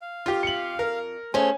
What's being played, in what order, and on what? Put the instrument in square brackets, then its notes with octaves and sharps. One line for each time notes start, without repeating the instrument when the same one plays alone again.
[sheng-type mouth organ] F5
[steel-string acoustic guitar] F2 [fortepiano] F4 G4
[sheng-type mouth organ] F5 [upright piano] C#7 F#7
[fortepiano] A#4
[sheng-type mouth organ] A3 G#4 [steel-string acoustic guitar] C#4 C5 [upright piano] G#5